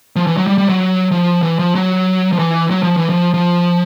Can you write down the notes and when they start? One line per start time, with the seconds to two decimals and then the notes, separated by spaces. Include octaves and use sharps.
0.16 F3
0.27 E3
0.37 F#3
0.47 G3
0.58 G3
0.69 F#3
1.12 F3
1.43 E3
1.59 F3
1.75 F#3
2.32 F3
2.39 E3
2.70 F#3
2.83 F3
2.97 E3
3.10 F3
3.34 F3